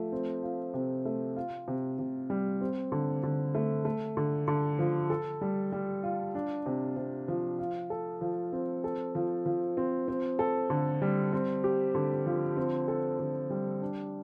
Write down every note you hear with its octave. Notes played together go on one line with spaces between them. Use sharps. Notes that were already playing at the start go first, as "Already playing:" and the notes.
Already playing: F3 A3
C4
F4
C3
A3
F4
C3
C3
G3
C4
D3
D3
A3
A3
D3
D3
F3
A4
G3
G3
F4
D4
C3
C3
F3
F4
A4
F3
C4
A4
F3
F3
C4
C4
A4
D3
G3
C4
G4
D3
F3
C4
A4
D3
G3
D4